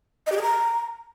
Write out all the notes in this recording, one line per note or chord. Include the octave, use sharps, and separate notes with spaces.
D#5
G4
G#4
A#5